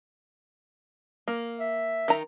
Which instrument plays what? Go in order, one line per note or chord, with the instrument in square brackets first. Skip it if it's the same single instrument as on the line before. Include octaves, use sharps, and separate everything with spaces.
[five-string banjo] A#3
[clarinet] E5
[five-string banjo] D#3 A#5